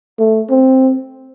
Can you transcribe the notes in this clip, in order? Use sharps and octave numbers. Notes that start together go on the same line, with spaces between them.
A3
C4